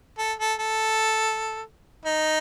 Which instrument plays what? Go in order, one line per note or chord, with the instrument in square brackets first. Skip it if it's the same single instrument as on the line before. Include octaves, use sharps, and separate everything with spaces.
[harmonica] A4
A4
A4
D#4